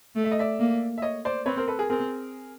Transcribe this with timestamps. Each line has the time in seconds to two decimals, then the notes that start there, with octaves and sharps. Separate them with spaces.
0.15 A3
0.24 E5
0.32 D#5
0.39 D5 E5
0.59 A#3
0.98 E5
1.02 C#5 D#5
1.25 C5 D5
1.46 C4 B4 C#5
1.57 A#4 C5
1.68 A4 B4
1.78 G#4 A#4
1.89 C4 G#4 A#4